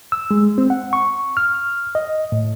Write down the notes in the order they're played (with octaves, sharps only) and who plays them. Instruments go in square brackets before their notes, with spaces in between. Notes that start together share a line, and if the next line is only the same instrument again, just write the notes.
[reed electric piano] E6
G#3
C4
F#5
C#6
F6
D#5
A2